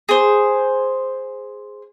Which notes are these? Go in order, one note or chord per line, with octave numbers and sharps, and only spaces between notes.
G#4 C5